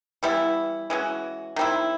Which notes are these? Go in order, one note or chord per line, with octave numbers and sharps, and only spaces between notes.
E3 G3 B3 E4
E3 G#3 C#4 F#4
D#3 G3 C4 E4